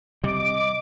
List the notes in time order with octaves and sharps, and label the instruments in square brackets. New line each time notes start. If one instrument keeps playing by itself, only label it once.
[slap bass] C3 G3 [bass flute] D#5 [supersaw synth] D6